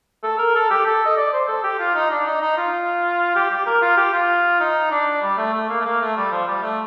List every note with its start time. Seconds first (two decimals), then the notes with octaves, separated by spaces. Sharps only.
0.23 A4
0.39 A#4
0.55 A4
0.70 G4
0.86 A4
1.06 D#5
1.17 D5
1.33 C5
1.48 A4
1.64 G4
1.79 F4
1.95 D#4
2.11 D4
2.26 D#4
2.41 D#4
2.57 F4
3.35 G4
3.51 G4
3.66 A#4
3.82 F4
3.97 G4
4.13 F4
4.60 D#4
4.91 D4
5.22 G3
5.37 A3
5.53 A3
5.69 A#3
5.80 A3
5.85 A#3
6.00 A3
6.16 G3
6.31 F3
6.47 G3
6.63 A3